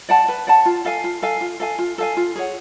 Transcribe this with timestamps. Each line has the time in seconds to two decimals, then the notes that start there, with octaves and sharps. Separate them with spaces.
0.09 D5 F#5 A5
0.28 B4
0.47 D5 F#5 A5
0.65 F4
0.85 A4 F5 G#5
1.04 F4
1.22 A4 F5 G#5
1.41 F4
1.60 A4 F5 G#5
1.78 F4
1.98 A4 F5 G#5
2.17 F4
2.36 G#4 C#5 F#5